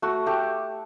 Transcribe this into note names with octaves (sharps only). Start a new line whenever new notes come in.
A3 F#4
A3 G4